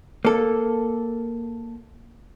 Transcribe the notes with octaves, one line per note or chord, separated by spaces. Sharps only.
A#3 A4